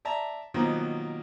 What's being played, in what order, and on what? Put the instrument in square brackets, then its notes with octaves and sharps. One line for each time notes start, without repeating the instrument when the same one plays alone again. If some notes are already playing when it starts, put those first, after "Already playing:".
[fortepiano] D5 E5 A5 A#5
B2 D#3 F3 F#3 A#3